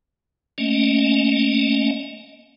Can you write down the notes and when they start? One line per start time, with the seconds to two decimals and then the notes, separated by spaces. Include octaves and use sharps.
0.58 A3 A#3 C#4 D#5